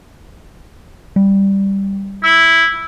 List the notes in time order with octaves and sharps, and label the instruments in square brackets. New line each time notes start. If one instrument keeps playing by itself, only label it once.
[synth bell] G3
[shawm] E4 [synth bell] E6